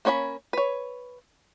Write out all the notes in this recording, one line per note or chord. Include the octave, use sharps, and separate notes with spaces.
A#3 C#4 C#5 D5 B5
B4 C#5